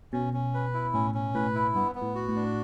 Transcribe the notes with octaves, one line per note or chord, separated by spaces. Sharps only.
B2 C#4
C#4
B4
E4
A2 C#4
C#4
A2 B4
E4
G2 B3
B3
A2
F#4
A2
D4